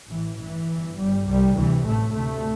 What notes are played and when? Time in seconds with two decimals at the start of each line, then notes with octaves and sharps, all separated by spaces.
0.09 A1 A2 E3
0.39 A1 G2 E3
0.68 G1 G2
0.97 G1 G2 G3
1.26 C2 C3 G3
1.56 D2 C3 E3
1.85 A1 A2 A3
2.14 D2 C3 A3